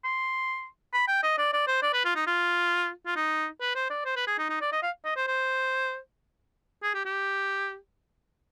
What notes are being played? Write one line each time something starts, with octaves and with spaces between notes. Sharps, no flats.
C6
B5
G5
D#5
D5
D5
C5
D5
B4
F4
D#4
F4
F4
D#4
B4
C5
D5
C5
B4
G#4
D#4
D#4
D5
D#5
F5
D#5
C5
C5
G#4
G4
G4